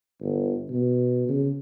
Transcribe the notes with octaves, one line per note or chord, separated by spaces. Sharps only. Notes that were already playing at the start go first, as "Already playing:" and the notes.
G1
B2
C#3